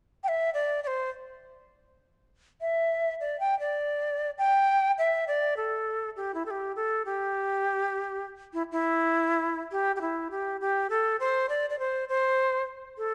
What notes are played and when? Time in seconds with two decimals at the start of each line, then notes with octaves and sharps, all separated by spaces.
0.24 G5
0.28 E5
0.54 D5
0.83 D5
0.87 C5
2.61 E5
3.20 D5
3.40 G5
3.59 D5
4.38 G5
4.98 E5
5.28 D5
5.57 A4
6.16 G4
6.34 E4
6.46 A4
6.50 G4
6.76 A4
7.06 G4
8.53 E4
8.72 E4
9.72 G4
9.96 G4
10.01 E4
10.31 G4
10.61 G4
10.90 A4
11.20 C5
11.49 D5
11.70 D5
11.79 C5
12.09 C5
12.98 A4